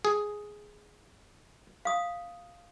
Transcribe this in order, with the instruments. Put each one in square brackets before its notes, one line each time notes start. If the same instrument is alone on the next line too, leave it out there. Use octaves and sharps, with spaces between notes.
[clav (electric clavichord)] G#4
[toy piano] F5 D#6